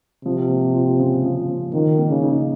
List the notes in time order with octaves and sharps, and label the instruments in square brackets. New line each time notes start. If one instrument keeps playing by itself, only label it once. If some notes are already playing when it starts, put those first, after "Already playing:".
[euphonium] C3 [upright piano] F3
[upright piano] A#3
F4
C#3
F3
A#3
[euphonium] D#3 [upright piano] F3
[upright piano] A#3
[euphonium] C#3
[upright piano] D#4